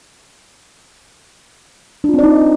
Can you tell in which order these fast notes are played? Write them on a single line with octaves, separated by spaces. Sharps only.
D4 F4 C4 D5 D#4